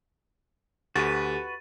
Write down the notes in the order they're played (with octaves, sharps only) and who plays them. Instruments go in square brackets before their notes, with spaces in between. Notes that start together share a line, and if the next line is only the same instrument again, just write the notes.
[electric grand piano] D2 [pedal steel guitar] F#4 B4 [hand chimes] G4 A4 [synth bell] A6 D#7